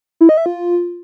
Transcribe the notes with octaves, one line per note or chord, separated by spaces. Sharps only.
E4
D#5
E5
F4